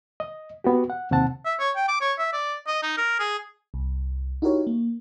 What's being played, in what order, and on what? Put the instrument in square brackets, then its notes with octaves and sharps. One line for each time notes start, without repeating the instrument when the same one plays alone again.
[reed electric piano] D#5
B3 F#4 G4
F#5
D#2 C3 C4 F#5 A5
[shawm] E5
C#5
G5
D6
C#5
E5
D5
D#5
D#4
A#4
G#4
[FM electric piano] C2
D#4 E4 F#4 G4 A#4 C#5
A#3